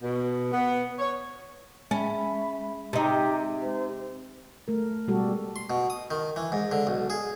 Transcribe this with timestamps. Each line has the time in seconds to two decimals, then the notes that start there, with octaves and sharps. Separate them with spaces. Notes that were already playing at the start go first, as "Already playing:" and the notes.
0.03 B2
0.52 B3
0.99 C#5
1.91 G#3 C#4 E5 B5
2.93 C3 D#4 G4
3.60 C5
4.68 A3 A#4
5.08 B2 G3 G#3 F#4 G4 A4
5.56 C6
5.70 B2
5.90 D#6
6.11 D#3
6.36 E3
6.52 G#2
6.72 D3
6.87 B1
7.10 G#4